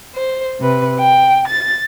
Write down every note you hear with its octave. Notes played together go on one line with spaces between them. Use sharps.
C5
C3 B4
G5
A6